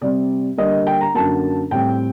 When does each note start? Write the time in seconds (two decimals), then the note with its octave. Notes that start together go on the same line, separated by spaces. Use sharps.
0.01 C3 G3 C4 D5
0.58 D3 G3 A#3 D#5
0.87 G5
1.01 A#5
1.14 F#2 D3 F#3 A#3 A5
1.71 A2 G3 C4 G5